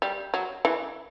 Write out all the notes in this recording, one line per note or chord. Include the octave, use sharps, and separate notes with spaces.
G3
F#3
E3